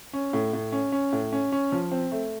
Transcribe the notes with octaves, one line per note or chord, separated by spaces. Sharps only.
C#4
A2
A2
C#4
C#4
A2
C#4
C#4
F3
C4
A3